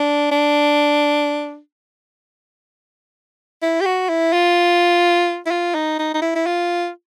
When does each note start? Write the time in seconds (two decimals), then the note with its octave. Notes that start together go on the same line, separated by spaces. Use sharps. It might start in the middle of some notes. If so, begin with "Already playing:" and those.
Already playing: D4
0.31 D4
3.62 E4
3.81 G4
3.85 F#4
4.09 E4
4.33 F4
5.46 E4
5.51 F4
5.75 D#4
5.99 D#4
6.14 D#4
6.22 E4
6.35 E4
6.46 F4